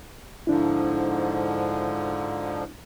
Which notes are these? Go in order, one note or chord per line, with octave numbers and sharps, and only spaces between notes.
G#2 D3 F3 D4 E4